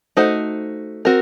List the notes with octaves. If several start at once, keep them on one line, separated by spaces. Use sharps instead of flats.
A3 D#4 F#4 C5
C4 F#4 A#4